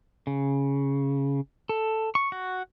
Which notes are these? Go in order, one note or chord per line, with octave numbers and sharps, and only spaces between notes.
C#3
A4
C#6
F#4